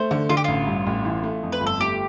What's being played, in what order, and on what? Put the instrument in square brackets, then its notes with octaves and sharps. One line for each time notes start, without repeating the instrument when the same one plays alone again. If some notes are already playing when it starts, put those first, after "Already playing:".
Already playing: [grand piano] A3 [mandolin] C5
[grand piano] D3
[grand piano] D3 [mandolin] F4
[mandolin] G4
[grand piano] A1 [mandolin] F4
[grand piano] G2
A1
E3
A3
F2
[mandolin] B4
[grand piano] G1
[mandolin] A4
[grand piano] A3 [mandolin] G4